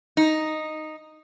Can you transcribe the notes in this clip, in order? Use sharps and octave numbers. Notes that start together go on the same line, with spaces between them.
D#4